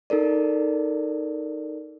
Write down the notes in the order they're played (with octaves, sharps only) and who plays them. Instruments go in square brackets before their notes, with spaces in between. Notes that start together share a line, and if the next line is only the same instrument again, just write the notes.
[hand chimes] D#4 A4 A#4 D5